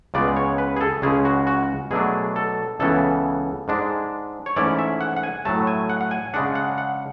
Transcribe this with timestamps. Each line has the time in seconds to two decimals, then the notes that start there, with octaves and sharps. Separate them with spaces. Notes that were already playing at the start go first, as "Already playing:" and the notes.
0.14 C#2 C#3 G#3 B3 D5
0.37 C#5
0.58 B4
0.76 G#4
0.81 A4
1.02 C#2 C#3 G#3 C#4 G#4
1.25 F#4
1.47 F#4
1.91 B2 F#3 A3 D4 G#4
2.36 A4
2.80 C#2 C#3 E3 B3 E4 A4
3.68 G#2 G#3 D4
4.46 C#5
4.56 G#2 E3 A3 C#4 E4 D5
4.79 E5
5.01 F#5
5.16 F#5
5.23 G#5
5.45 A2 F#3 A3 A5
5.67 G#5
5.90 F#5
6.01 F#5
6.11 G#5
6.34 C#3 G#3 D4 F#5
6.55 F#5
6.78 F#5